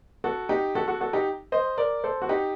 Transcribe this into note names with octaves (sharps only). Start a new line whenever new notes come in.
F#4 A4
D#4 G4
F#4 A4
F#4 A4
F#4 A4
D#4 G4
C5 D#5
A#4 D5
A4 C5
F#4
D#4 G4